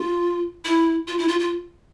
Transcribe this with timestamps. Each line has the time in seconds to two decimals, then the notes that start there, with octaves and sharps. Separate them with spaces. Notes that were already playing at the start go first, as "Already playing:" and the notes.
Already playing: F4
0.65 E4
1.07 F4
1.18 E4
1.28 F4
1.40 F4